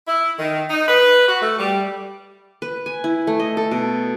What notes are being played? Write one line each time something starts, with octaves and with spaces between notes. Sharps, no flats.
E4
D#3
D#4
B4
F#4
A3
G3
B4
G#5
E4
A3
D#5
A4
B2